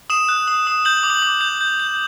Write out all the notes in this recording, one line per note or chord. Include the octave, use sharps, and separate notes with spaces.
D#6 E7
F#6
D#6
D#6
G6 F#7
F#7
D6
F#7
D6
G6
G6
G6